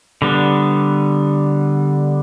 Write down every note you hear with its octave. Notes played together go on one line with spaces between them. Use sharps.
D3 G3 B3